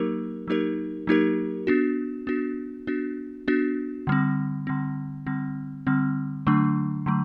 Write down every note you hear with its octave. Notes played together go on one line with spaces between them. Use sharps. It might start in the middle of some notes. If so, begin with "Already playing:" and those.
Already playing: F#3 A#3 D#4 G4 A#4
F#3 A#3 D#4 G4 A#4
F#3 A#3 D#4 G4 A#4
B3 D4 F#4
B3 D4 F#4
B3 D4 F#4
B3 D4 F#4
D3 G3 C4
D3 G3 C4
D3 G3 C4
D3 G3 C4
D3 F#3 A3 D4
D3 F#3 A3